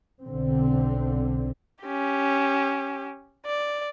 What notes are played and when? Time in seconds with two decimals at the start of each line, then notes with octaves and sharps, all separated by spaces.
0.24 B1 D3 C4
1.83 C#4 G4
3.45 D5